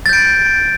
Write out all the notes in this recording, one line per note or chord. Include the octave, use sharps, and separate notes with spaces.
G6 A6 D7